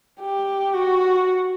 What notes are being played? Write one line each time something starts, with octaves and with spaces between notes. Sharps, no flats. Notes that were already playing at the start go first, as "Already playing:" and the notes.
G4
F#4